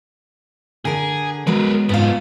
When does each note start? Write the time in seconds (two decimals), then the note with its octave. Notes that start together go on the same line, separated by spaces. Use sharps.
0.85 D3 G#4 A#4
1.47 F#3 G#3 B3 A#4 B4
1.89 G#2 C3 B3 F4 F5